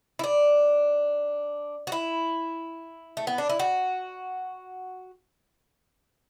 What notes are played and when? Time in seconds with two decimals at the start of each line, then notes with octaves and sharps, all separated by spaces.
0.19 E4
0.24 D4
1.87 F#4
1.92 E4
3.17 A3
3.27 B3
3.38 D4
3.50 E4
3.60 F#4